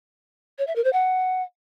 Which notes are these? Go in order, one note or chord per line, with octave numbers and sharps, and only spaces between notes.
C#5
E5
A#4
C5
F#5